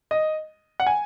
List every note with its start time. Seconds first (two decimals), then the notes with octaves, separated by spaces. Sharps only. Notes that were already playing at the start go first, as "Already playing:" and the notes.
0.11 D#5
0.80 F#5
0.87 G#5